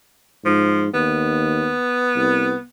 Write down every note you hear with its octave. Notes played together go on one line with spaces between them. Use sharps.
G#2 F3
D#2 B3
C2